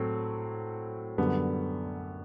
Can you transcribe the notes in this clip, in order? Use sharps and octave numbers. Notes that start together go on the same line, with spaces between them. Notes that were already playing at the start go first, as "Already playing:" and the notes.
Already playing: A2 F#3 A3 C4
F#2 D3 G3 B3